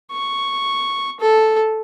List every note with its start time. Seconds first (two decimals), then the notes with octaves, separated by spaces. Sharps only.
0.12 C#6
1.20 A4